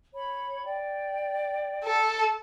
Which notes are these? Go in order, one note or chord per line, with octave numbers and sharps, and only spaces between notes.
C#5 B5
D5 G5
A4